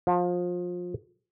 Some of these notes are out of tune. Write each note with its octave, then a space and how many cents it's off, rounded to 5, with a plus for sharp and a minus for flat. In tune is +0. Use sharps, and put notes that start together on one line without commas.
F3 +25